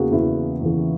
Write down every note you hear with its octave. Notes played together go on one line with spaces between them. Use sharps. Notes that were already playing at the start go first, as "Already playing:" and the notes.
Already playing: E2 C#3 E3 A#3 F#4 G#4
E2 C#3 E3 E4
E2 C#3 E3